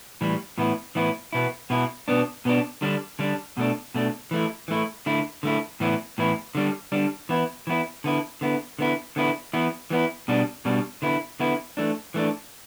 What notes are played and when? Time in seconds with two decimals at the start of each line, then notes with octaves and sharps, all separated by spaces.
0.21 A2 E3 G3
0.58 A2 E3 B3 E4
0.95 A2 E3 B3 E4
1.33 B2 B3 E4
1.70 B2 B3 E4
2.08 B2 B3 D4
2.45 B2 B3 D4
2.82 D3 G3 D4
3.19 D3 G3 D4
3.57 B2 A3 D4
3.94 B2 A3 D4
4.31 E3 A3 E4
4.68 E3 A3 E4
5.06 D3 A3 E4
5.43 D3 A3 E4
5.80 A2 E3 B3 E4
6.18 A2 E3 B3 E4
6.55 D3 G3 D4
6.92 D3 G3 D4
7.29 E3 B3 E4
7.67 E3 B3 E4
8.04 D3 B3 E4
8.41 D3 B3 E4
8.79 D3 B3 E4
9.16 D3 B3 E4
9.53 E3 B3 E4
9.90 E3 B3 E4
10.28 B2 G3 D4
10.65 B2 G3 D4
11.02 D3 B3 E4
11.40 D3 B3 E4
11.77 E3 A3 D4
12.14 E3 A3 D4